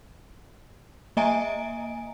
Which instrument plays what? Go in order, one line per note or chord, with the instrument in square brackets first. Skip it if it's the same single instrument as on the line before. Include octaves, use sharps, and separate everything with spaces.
[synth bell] A#3 D#5 E5 G#5 A#5 D7